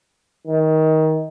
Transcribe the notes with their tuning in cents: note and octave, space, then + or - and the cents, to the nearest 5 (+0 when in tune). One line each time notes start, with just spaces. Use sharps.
D#3 +20